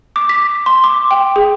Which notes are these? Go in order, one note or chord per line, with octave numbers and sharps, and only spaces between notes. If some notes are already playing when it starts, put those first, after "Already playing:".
D6
B6
C6
D6
G5
G#4